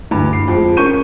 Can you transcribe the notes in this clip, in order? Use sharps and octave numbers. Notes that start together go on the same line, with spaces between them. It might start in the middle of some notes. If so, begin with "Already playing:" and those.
D2 G2 E3
C7
F2 G#3
C#4 A#4 C#6 G6 D#7